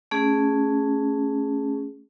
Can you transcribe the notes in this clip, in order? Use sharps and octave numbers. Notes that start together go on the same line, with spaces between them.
A3 C#4 G#4